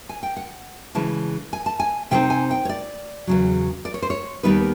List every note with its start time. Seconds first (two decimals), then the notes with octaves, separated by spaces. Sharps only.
0.09 G#5
0.23 G5
0.37 F#5
0.95 C#3 E3 G#3 A5
1.53 G#5
1.66 A5
1.80 G#5
2.11 C3 F3 G#3 C4 D#4 G5
2.30 G#5
2.51 G5
2.65 C#5
2.69 D5
3.27 E2 C#3 F#3
3.85 D5
3.94 C#5
4.03 C5
4.10 C#5
4.43 D#2 D#3 G3 B3 D#4 B4